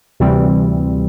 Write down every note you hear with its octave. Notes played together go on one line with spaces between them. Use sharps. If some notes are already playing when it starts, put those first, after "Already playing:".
D2 C3 E3 G3 C4